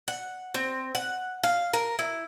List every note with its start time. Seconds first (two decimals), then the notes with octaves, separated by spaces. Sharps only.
0.08 F#5
0.54 C4
0.95 F#5
1.43 F5
1.73 A#4
1.99 E4